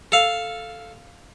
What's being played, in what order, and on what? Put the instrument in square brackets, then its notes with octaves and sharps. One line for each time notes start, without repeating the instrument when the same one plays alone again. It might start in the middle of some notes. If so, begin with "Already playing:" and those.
[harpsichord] A4 F5